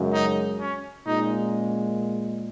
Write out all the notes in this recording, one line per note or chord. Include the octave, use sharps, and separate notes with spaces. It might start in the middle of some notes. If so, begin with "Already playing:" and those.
Already playing: F#2 C#3 G#3
D#4
C#4
A#2 G#3 C#4 D#4